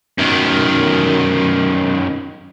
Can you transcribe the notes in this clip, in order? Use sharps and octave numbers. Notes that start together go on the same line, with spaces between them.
F#2 D#3